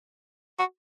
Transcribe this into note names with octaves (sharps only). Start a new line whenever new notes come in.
F#4